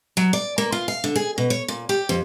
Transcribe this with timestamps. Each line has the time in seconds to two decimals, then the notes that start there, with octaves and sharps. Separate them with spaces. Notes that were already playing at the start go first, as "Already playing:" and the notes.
0.17 F#3
0.33 D5
0.58 A#3
0.72 F4
0.88 F5
1.04 D3
1.16 G#4
1.38 B2
1.50 C#5
1.68 A#2
1.89 G4
2.09 F2